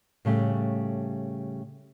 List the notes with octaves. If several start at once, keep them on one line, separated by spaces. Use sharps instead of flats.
A2 C#3 G3 A3